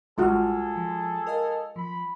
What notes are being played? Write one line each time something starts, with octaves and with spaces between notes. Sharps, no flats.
A1 G3 G#3 F4 F#4 G#4 A4 F6
F3
A#4 D#5 F5
F3 B5